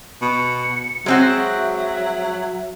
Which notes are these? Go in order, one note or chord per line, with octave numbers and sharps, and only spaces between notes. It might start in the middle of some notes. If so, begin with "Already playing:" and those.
B2 C#7
F#3 G#3 C4 F#4 E5